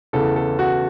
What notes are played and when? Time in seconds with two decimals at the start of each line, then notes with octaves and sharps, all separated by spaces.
0.13 E2 C#3 E3 A4
0.36 A4
0.59 F#4